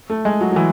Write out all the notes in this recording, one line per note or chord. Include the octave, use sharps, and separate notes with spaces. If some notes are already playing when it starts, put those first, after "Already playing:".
A3
G#3
F#3
F#3
E3